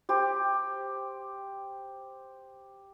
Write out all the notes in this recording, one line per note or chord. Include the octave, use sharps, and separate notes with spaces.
G4 C5